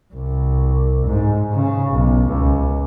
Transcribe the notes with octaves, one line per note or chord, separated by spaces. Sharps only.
C2
G#2
C#3
B1
C#2